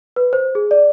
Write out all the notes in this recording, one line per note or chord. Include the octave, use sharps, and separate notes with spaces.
B4
C5
G#4
D5